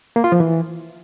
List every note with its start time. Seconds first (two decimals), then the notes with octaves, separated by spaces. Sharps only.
0.16 A#3
0.24 F4
0.32 F3
0.40 E3